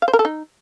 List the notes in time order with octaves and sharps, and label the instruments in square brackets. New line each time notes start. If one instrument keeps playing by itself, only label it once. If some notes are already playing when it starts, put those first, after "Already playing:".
[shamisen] F5
C5
A#4
A4
D#4